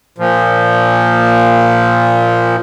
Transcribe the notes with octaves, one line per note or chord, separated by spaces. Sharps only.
A#2 F3